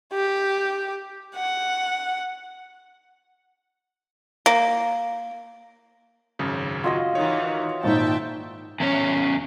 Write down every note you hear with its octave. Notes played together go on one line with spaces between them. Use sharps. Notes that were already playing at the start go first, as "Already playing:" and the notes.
G4
F#5
A#3
G#1 F#2 C#3
F4 F#4 D#5 G#6 A#6
D#3 E3 C#5
G#1 A#2 D#4 E5 G5 A5
E2 C#4